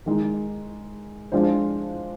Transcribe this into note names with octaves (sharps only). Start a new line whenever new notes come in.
D#3 G#3 D#4
F3 G#3 D4 F4 C5